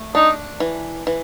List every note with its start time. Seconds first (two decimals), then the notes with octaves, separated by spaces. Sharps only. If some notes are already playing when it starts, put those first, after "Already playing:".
Already playing: A3
0.15 D4 D#4
0.60 E3
1.07 E3